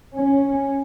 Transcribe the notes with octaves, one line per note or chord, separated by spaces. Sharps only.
C#4